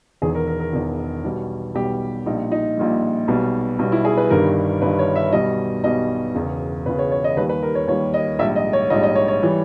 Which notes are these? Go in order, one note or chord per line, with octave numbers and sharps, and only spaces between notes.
E1 E2 D#3 G#4
A#4
A#4
A#4
E1 E2 D#3
B1 B2 G3
B1 B2 G3 G4
A#1 A#2 G3 D#4
D#4
A#1 A#2 G3
B1 B2 G3
B1 B2 G3
E4
G#4
B4
G1 G2 D#3 G3 A#4
G1 G2 D#3 G3 B4
C#5
E5
B1 B2 G3 D#5
B1 B2 G3 D#5
E1 E2 C#3
E1 E2 C#3 B4
C#5
C#5
D#5
D#2 D#3 G3 B4
B4
A#4
C#5
D#2 D#3 G3 C#5
D#5
A#1 G#2 G3 E5
D#5
C#5
A#1 G#2 G3 D#5
D#5
C#5
C#5
E3 G3